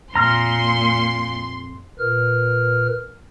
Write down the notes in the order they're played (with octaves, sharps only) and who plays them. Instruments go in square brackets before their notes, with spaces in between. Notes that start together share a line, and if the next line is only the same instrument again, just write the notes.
[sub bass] F2 [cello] A#2 [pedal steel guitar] A#5 F6 [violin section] C6
[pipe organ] A#2 A#4 B4 F6